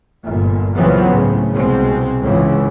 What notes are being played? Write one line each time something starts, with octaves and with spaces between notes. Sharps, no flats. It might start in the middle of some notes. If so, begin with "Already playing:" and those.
G1 A#2
C#2 A#2 E3 F#3 B3 C4
A2 C#3
C2 B2 G#3 C4
C#2 G#2 C#3 E3